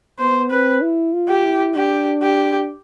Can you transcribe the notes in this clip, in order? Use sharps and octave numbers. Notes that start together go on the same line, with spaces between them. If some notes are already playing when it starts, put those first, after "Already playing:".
B3 C5
C4 B4
E4
F4
G4
E4
D4 G4
G4